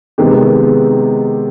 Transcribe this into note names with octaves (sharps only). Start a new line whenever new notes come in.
C3 D#3 G#3 B3 G4